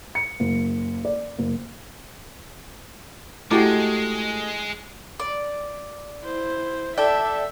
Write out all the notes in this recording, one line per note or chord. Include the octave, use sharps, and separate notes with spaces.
C#7
F#1
D5
F#1
G#3 A3 E4 F#4 G4 D6
D5
E4 C5
A4 D5 E5 G5